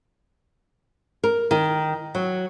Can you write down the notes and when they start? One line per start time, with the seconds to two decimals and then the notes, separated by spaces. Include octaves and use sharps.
1.24 A#4
1.51 D#3
2.15 F#3